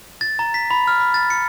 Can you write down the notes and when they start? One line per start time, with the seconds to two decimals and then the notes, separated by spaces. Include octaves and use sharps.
0.21 A6
0.39 A#5
0.54 B6
0.71 B5
0.87 F6
1.00 B5
1.14 A6
1.30 C#7